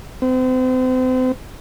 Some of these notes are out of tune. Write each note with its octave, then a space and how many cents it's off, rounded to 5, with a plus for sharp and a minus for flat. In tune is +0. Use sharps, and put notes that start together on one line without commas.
C4 -35